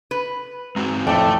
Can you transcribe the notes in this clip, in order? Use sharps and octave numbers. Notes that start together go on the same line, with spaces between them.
B4
G#3 C4 F#4 A#5
F2 A2 A3 D4 G5